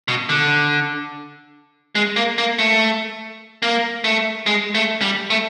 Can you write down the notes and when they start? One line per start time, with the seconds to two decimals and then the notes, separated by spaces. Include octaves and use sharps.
0.08 B2
0.29 D3
1.95 G#3
2.16 A#3
2.38 A#3
2.58 A3
3.62 A#3
4.04 A3
4.46 G#3
4.75 A3
5.01 G3
5.30 A3